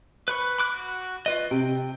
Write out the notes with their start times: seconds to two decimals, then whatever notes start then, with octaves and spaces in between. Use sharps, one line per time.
0.28 B4 B5 C#6
0.58 B5 D6 F#6
0.74 F#4
1.26 F4 B4 D#5
1.51 C3 G5